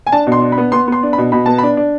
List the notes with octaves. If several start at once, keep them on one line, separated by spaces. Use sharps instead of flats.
G#5
D4 A5
B2
C6
D4
B5
B3
B3 C6
B3 C6
D4
B5
B2
B2 B5
B3 A5
D4 B5
D4